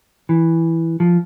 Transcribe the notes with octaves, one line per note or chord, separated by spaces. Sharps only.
E3
F3